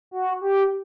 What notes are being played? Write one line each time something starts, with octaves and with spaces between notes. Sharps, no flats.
F#4
G4